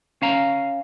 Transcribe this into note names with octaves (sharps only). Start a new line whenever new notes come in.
C#4 F5 A#5